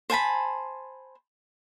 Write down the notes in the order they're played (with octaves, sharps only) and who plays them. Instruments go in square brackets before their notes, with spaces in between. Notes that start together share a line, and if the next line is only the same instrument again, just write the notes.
[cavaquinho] C5 G#5 A5 B5